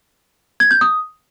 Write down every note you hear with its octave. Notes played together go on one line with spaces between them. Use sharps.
G#6
G6
D#6